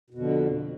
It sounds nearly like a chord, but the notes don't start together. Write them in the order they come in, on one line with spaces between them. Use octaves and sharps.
B2 F2 D3